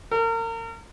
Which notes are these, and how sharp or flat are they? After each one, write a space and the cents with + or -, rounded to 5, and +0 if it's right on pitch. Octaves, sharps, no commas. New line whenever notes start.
A#4 -35